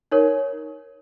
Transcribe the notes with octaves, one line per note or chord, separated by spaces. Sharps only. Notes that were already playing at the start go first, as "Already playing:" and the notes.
D#4 A#4 C#5